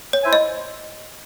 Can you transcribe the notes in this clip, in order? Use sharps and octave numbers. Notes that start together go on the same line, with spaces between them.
C#5
E4 C5 E5 G#5
D#5